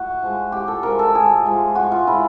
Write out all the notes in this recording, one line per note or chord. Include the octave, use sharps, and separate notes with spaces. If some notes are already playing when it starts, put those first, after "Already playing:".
Already playing: A2 F#4
F3 G#3
A2 G4
A4
F3 G#3 A#4
A4
A2 G#4
F3 G#3
A2 F#4
F4
F3 G#3 E4